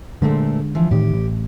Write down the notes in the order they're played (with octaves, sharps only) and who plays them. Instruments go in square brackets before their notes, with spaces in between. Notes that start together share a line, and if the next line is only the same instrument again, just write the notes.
[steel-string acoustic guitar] A#2 A3 C4 [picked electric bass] D3 G#3
[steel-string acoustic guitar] E3 F3
[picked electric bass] A2 D#3 [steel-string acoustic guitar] G4
[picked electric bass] A1